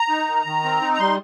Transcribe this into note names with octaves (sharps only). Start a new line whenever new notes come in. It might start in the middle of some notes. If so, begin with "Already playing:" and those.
Already playing: A#5
D#4
D#3
D#3
C4
D#4
A#5
G3 C6